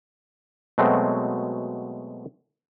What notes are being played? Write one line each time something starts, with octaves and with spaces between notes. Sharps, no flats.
B2 F#3 G#3 A3 C4